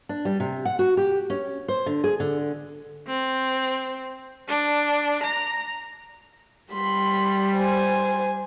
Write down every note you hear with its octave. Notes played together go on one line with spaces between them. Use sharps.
D4
G3
C3
F#5
F#4
G4
C#4
C5
D3
G#4
D3
C4
D4
A#5
G3 B5 C6
C5 G#5